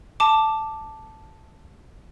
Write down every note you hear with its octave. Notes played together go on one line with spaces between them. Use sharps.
A5 D6